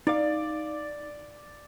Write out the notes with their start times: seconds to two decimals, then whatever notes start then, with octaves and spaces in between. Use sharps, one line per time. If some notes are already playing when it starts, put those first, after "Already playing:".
0.07 D#4 D5 F5